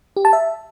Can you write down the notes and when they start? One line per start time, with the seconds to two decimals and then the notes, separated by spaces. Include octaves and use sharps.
0.17 G4
0.25 A5
0.33 E5